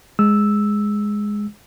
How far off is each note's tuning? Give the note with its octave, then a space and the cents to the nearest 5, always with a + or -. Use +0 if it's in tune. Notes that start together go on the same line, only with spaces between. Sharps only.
G#3 +0 E6 -5